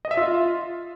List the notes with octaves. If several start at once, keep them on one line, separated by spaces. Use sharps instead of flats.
D#5
E5
F4